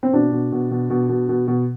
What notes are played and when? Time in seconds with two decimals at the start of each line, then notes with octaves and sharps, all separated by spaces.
0.03 C4
0.13 B2 D4
0.32 B2
0.52 B2
0.71 B2
0.90 B2
1.09 B2
1.29 B2
1.47 B2